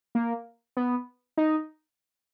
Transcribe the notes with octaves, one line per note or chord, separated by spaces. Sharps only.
A#3
B3
D#4